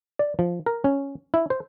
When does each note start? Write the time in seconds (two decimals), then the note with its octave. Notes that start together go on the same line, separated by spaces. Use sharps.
0.19 D5
0.39 F3
0.66 A#4
0.84 C#4
1.34 E4
1.50 C5